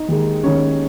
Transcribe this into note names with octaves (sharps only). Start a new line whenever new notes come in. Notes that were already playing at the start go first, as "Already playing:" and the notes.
Already playing: D#4
D#2 D#3 G#3
D#2 D#3 G#3 C#4 C#5